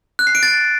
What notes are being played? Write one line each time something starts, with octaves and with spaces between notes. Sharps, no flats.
F#6
C7
D7
A6